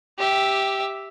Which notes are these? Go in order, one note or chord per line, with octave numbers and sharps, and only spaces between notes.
G4 E5